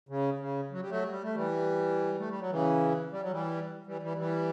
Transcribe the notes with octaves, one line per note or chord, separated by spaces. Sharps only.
C#3
C#3
F#3
G3
F#3 A3
G3
A3
E3 G3
A3
G3
F#3
C#3 E3
G3
F#3
E3 G3
E3 G3
E3 G3
E3 G3